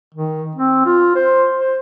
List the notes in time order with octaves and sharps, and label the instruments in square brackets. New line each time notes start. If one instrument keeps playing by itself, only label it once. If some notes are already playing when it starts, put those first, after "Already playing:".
[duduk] D#3
C4
F4
C5
C5